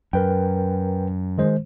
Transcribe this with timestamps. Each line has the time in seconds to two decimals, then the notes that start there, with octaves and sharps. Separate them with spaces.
0.13 F#2 A#4 B4 G5
1.38 D#3 G#3 C5